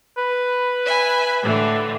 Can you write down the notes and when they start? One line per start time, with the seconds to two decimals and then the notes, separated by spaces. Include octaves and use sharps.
0.18 B4
0.85 E5 G#5
1.42 A2 D3 E3